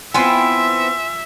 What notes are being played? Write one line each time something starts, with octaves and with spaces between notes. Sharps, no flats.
B3 C4 E4 F4 E5 G#5 C6